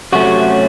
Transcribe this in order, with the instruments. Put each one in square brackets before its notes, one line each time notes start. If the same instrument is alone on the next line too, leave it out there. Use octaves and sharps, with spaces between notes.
[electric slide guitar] C3 F#3 A3 C#4 F#4